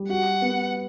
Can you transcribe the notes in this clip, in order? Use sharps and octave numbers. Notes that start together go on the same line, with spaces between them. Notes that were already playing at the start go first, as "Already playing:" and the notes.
Already playing: G3
F#4 F#5
B3